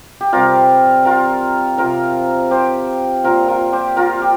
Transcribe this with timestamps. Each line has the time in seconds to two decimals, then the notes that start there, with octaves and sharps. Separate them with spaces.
0.21 G4
0.33 C3 G3 F4 A#4
1.05 F4 A#4
1.78 C3 F3 F4 A#4
2.51 G4 C5
3.24 A#2 F3 F4 A#4
3.48 F4 A#4
3.73 G4 C5
3.97 F4 A#4
4.22 G4